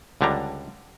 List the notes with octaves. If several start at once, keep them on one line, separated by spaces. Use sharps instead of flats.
C#2 D3 G3 D4 A#5